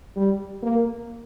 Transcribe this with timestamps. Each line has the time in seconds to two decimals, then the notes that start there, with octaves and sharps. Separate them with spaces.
0.16 G3
0.63 A#3